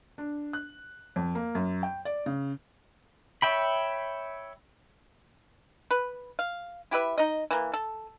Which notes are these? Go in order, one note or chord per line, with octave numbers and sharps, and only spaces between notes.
D4
F#6
F2
A#3
F#2
G5
D5
C#3
C#5 E5 G5 B5
B4
F5
E4 G4 B4 E5
D#4 D#5
E3 A#3
A4